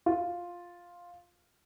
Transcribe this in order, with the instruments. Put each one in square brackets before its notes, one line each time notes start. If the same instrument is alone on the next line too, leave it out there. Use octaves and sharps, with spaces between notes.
[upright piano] F4